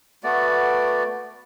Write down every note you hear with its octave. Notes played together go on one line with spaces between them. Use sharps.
A3 B3 F#4 D5